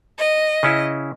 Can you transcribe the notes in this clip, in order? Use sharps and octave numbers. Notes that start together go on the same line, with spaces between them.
D#5
C#3 C#4 E4